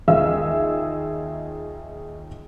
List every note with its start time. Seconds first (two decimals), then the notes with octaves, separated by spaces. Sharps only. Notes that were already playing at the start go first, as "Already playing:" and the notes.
0.08 D#2 D#4 F4 G#4 E5 E6